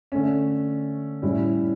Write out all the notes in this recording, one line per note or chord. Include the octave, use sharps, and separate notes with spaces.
D3 A3 C#4
A2 G3 C#4 E4